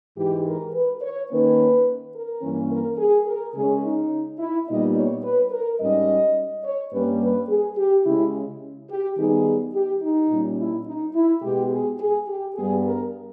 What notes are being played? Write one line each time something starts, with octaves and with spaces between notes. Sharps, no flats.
G#2 E3 G#3 G4
A#4
B4
C#5
D#3 A#3 C#4 B4
A#4
G2 E3 A#3 C#4
A#4
G#4
A#4
C#3 G#3 C#4 G#4
D#4
E4
A#2 G3 B3 D#4 D#5
C#5
B4
A#4
G#2 G3 C#4 D#5
C#5
G2 G3 A#3 C#4 B4
B4
G#4
G4
C#3 G#3 C#4 E4
G4
D#3 G3 B3 D#4 G#4
G4
D#4
A#2 G3 C#4
E4
D#4
E4
B2 G#3 B3 G4
G#4
G#4
G4
G2 G3 B3 G#4
A#4